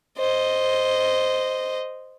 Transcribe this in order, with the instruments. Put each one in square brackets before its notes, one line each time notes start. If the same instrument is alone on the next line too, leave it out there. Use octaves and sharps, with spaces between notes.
[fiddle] C5 D#5